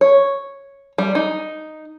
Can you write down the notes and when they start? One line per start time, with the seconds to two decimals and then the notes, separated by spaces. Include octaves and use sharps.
0.01 C#5
0.98 G3
1.15 D#4